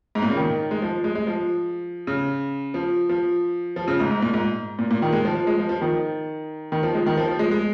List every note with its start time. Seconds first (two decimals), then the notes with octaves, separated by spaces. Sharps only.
0.15 G#2
0.22 A#2
0.30 C#3
0.37 D#3
0.71 G#3
0.82 F3
1.04 G#3
1.15 G#3
1.27 F3
2.07 C#3
2.74 F3
3.09 F3
3.76 F3
3.88 C#3
4.00 G#2
4.11 G#2
4.22 A#2
4.34 G#2
4.79 A#2
4.91 A#2
5.02 D#3
5.12 G#3
5.25 F3
5.35 F3
5.47 G#3
5.59 F3
5.69 F3
5.81 D#3
6.72 D#3
6.83 F3
6.94 G#3
7.06 D#3
7.17 F3
7.28 F3
7.39 G#3
7.51 G#3